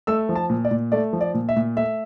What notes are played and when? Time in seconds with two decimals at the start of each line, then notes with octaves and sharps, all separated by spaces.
0.07 A3 E6
0.29 F3
0.35 A5
0.50 A#2
0.65 D5
0.71 A#2
0.92 A3 D5
1.13 F3
1.21 D5
1.34 A#2
1.49 E5
1.56 A#2
1.77 A3 E5